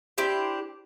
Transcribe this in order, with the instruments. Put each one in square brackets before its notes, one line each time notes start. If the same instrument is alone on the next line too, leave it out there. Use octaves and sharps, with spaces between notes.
[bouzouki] D4 E4 G4 C5